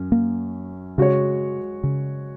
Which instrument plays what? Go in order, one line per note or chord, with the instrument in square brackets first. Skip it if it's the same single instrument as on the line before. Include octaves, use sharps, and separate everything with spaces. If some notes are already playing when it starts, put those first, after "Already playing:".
Already playing: [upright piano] F#2 C#4
[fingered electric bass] A#3
[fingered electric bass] C#3 [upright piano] G#3 F#4 C#5
[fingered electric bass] C#3